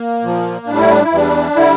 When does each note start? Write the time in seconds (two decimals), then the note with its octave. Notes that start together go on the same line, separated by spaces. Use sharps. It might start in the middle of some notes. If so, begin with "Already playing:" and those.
Already playing: A#3
0.22 A#2 F3
0.66 A2 G3 D4
0.79 E4
0.91 D4
1.04 E4
1.11 E2 E3 G3 D4
1.56 D3 G3 E4